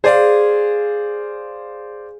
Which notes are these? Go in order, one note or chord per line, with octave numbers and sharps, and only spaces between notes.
G#4 C5 D5 F5